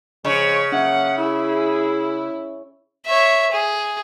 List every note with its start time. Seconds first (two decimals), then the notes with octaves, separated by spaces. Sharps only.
0.25 C#3 F3 G#3 C#5 D#5
0.72 F#3 A#3 C#4 E5 F#5
1.19 E4 G#4
3.06 C#5 E5
3.52 G#4